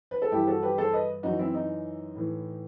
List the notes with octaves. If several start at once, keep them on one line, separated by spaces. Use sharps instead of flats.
B4
A4
G2 E3 E4 G4
F#4 A4
G4 B4
A4 C5
B4 D#5
F#2 E3 D#4 F#4
C4 E4
D#4
A2 E3